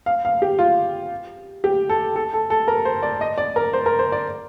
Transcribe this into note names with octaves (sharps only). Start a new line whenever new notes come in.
F5
F5
G4
F4
G4
A4
A4
A4
A4
A#4
C5
D5
D#5
D5
A#4
C5
A#4
C5
D5